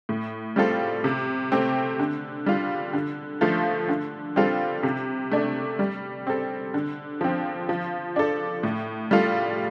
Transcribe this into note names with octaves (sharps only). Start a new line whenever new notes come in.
A2
G3 C4 F4 A4
C3
A3 C4 G4
D3
G3 F4
D3
F3 A3 F4 A4
D3
G3 C4 F4 A4
C3
A3 D4
G3
C4 A4
D3
F3 C4
F3
D4 A4
A2
G3 F4 A4